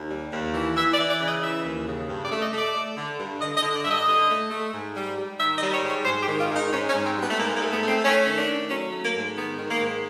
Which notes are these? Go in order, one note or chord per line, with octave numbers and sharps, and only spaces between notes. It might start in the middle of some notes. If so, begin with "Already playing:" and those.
Already playing: D#2
G3
D#2
E3
E3 E5
D5
E3
D5
C#3
D#5
E3 E5
D#2
C#3
G2
D5
A3
D#5
A3
D5
A3
D3
G2
D3 D#5
D#5
D3
D5
G2 E5
D#5
D3
A3
A3
G#2
G3
G3
D#3 E5
D#5
G3
C#5
G#2
C#5
G#2 C5
G4
D#3
F4
G#2 D#4
G#2 C#4
C#4
G#2
C4
G3 B3
A3
G#2 A#3
A#3
A3
B3
A3
C4
A3 C#4
D#3 C#4
D4
A3
F#3 C#4
A3
A#3
G#2
D#3 B3
D#3
A#3
G#2